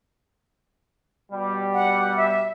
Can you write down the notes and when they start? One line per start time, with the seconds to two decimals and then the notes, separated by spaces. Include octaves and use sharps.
1.32 B2 G3
1.73 F#5
2.17 E5